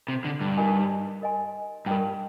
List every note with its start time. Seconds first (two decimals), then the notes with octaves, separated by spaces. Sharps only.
0.08 C3
0.25 D3
0.41 G2
0.57 D#4 G4 A#4 D#5 G#5
1.22 A#4 D#5 G#5 C6
1.86 G2 A#4 D#5 G5 A#5